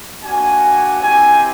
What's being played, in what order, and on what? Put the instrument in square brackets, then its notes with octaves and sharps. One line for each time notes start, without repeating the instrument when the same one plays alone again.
[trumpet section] A#3 D4 F#4 G#5
C4 E4 G4 G#5